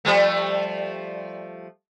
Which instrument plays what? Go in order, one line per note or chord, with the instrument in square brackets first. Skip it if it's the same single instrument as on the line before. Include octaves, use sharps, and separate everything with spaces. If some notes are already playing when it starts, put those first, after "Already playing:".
[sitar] F3 G3 A3